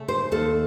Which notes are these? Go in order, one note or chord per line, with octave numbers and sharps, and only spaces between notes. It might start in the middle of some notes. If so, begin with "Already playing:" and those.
Already playing: C#3 A3
C5
D#2 A4